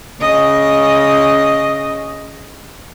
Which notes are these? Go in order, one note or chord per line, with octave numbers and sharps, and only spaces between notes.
C#3 D#5